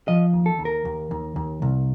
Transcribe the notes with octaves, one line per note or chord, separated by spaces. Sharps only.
F3 D#5
D#2
A4
D#2
A#4
D#2
D#2
D#2
C2